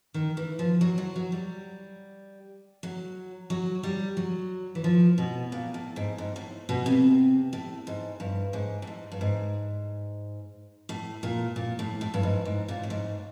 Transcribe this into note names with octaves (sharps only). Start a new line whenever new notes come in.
D#3
E3
F3
F#3
F#3
F#3
G3
F#3
F#3
G3
F#3
E3
F3
B2
A#2
A2
G#2
G#2
A2
B2
C3
A2
G#2
G2
G#2
A2
G#2
G2
G#2
A2
A#2
A#2
A2
A2
G2
G#2
G#2
A#2
A2
G#2